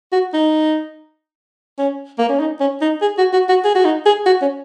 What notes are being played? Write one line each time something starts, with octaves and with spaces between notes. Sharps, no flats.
F#4
D#4
C#4
A#3
C#4
D#4
C#4
D#4
G#4
F#4
F#4
F#4
G#4
F#4
D#4
G#4
F#4
C#4